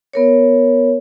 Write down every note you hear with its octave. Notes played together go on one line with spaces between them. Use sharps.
B3 A#4 C#5